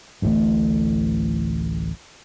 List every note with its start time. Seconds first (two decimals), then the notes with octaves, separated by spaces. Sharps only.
0.22 D1 A1 A2 A3